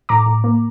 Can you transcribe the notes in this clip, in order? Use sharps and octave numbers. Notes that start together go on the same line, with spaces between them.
A2 A#5 D6
A2
A#3